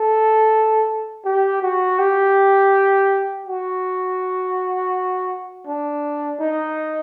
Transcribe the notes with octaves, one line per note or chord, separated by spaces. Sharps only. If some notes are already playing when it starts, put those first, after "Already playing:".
Already playing: A4
G4
F#4
G4
F#4
D4
D#4